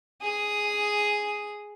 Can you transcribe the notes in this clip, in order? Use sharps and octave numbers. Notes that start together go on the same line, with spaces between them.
G#4 D#6